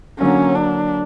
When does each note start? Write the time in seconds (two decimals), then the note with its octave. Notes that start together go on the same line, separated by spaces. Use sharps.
0.19 D3 F#3 A#3 C#4
0.55 D4